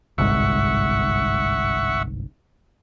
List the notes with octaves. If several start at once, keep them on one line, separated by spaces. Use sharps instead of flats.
G1 C2 G#2 E5 F#5 C#6